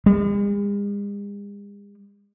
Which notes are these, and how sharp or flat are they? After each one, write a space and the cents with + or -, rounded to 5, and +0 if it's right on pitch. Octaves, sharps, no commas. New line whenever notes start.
G#3 -45